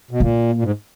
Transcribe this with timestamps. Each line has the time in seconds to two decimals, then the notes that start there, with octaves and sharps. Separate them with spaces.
0.11 B2
0.20 A#2 A#3
0.55 A#2
0.63 G#2